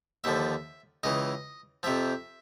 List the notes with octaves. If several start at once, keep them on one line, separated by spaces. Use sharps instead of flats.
D#2 D3 F3 E5
C#2 C#3 E3 D#5
F2 C3 F3 E5